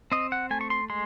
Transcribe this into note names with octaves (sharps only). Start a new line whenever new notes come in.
C4 D#5
F#5
A3 G#5
C#6
C6
G#3 C6